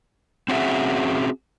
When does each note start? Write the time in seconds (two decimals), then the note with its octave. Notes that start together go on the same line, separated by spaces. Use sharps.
0.48 C4 C#4 F#4 G#4 E5